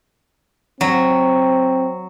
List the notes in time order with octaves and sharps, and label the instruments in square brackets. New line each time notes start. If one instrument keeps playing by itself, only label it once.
[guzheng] F#3 [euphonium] C4